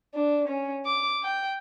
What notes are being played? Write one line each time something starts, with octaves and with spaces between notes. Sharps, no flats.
D4
C#4
D6
G5